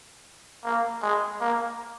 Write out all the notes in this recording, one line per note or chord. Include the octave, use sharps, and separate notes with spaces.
A#3
G#3
A#3